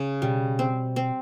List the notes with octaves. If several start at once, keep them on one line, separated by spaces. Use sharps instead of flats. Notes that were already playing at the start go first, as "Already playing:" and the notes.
Already playing: C#3
B2 G3
C4
C4